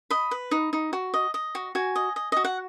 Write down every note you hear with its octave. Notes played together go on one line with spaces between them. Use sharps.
D#5 B5
B4
D#4
D#4
F#4
D#5
D#5
F#4
F#4 G#5
D#5
D#5
F#4 D#5
F#5